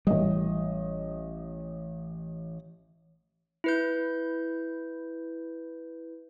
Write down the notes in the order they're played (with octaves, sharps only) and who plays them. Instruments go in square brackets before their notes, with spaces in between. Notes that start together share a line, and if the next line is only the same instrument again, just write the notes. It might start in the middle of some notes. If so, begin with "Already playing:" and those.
[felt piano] A1 D#5 [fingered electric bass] G3
[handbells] E4 B4 G6